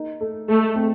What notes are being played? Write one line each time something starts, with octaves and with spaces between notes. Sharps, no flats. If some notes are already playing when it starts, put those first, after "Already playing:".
Already playing: A#3 D#4
A3
A3 A4
C4